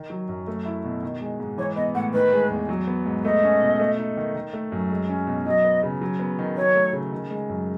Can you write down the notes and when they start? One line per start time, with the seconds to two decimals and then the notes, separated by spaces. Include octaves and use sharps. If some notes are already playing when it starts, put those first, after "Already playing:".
Already playing: D#3
0.10 F#3
0.29 F#2
0.47 A3
0.66 E4
0.84 B2
1.03 D#3
1.21 G#3
1.40 G#2
1.58 E3 C#5
1.76 B3 D#5
1.95 A2 F#5
2.13 D#3 B4
2.33 G#3
2.50 E2
2.69 F#3
2.87 B3
3.06 G#2
3.24 A3 D#5
3.43 C#4
3.62 B2
3.79 A3
3.98 D#4
4.17 D#3
4.35 D#3
4.53 A3
4.72 F#2
4.90 G#3
5.09 C#4
5.27 B2
5.46 F#3 D#5
5.64 B3
5.83 C#3
6.02 F#3
6.20 B3
6.39 D#3
6.57 F#3 C#5
6.75 A3
6.93 C#3
7.12 D#3
7.31 G#3
7.49 F#2